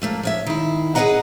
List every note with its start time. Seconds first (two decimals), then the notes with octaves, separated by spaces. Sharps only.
0.02 F3 A3 A#3
0.23 F3 C#5 E5
0.46 D#3 E4
0.95 G#4 B4 D5 D#5 F#5 A#5